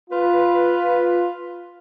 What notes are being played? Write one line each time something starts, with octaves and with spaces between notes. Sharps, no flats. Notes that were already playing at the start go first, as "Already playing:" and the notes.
F4 B4